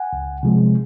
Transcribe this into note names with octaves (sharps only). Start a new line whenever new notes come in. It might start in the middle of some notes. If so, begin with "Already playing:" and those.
Already playing: F#5 G#5
C#2
C3 F3 G#3